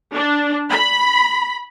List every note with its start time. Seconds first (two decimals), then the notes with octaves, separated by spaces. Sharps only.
0.14 D4
0.70 B5